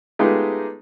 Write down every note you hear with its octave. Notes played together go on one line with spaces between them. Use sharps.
G#3 A3 B3 D#4 F4 G4